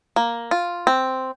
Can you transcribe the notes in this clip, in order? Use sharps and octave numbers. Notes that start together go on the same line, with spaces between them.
A#3
F4
C4